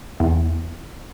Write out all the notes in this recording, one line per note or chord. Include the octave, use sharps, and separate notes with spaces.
E2